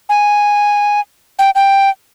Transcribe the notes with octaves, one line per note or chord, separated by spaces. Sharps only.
G#5
G5
G5